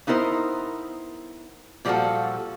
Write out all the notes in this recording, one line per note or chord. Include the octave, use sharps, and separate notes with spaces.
B3 D#4 E4 A#4 C5
A#2 F3 G3 E4 F#4 A4